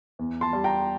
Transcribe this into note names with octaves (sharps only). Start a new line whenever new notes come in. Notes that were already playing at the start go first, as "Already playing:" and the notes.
E2
A5 C6
G3
G5 A#5